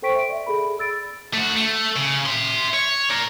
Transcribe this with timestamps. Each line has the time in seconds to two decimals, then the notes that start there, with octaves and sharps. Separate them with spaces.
0.02 A4 C5 G5 C#6 B6 D7
0.15 E5 C6 D7
0.29 D5 E5
0.46 G#4 A4 B5
0.64 G#4
0.78 D5 B5 E6 A6 D7
1.34 A3 F#4
1.57 A3
1.97 C#3
2.26 E5 C6
2.74 C#5
3.10 A#4 D5